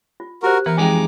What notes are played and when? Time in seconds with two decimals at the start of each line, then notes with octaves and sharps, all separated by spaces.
0.20 F4
0.43 F#4 G4 A#4 C5
0.66 E3 B3 A#4
0.77 F2 G#3 D#4 G5 G#5 D6